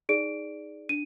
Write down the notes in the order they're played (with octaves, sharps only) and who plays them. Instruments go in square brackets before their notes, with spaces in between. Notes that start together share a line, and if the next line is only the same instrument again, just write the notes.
[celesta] D#4 G#4 D5 D7
D4 D#7